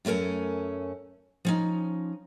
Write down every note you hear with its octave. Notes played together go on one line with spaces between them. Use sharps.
F#2 A3 C#4 A#4 G#5
F3 C#4 D#4